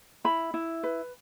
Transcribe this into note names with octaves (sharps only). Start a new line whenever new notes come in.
E4 B5
E4
B4